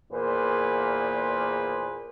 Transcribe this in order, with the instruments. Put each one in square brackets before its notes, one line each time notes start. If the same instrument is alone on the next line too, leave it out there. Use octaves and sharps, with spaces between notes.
[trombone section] E2 A#2 A#3 G#4 B4 C5